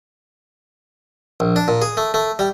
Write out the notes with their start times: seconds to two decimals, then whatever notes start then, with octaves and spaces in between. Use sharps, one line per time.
1.40 A#1
1.56 D4
1.68 A#2
1.82 G#4
1.97 A3
2.14 A3
2.39 G3